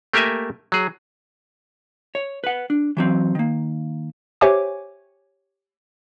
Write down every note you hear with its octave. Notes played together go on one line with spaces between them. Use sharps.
A3 A#3 G4 A#4 E5 G#5
F#3 G#4
C#5
B4 F#5
D4
E3 F#3 C4
D#3 A#3
G4 C5 C#5 E5 G#5 D6